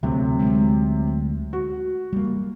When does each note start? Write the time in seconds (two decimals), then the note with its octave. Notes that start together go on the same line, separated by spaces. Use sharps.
0.03 D2 C3 F#3 A3
0.39 G#3
1.53 F#4
2.13 G3 A#3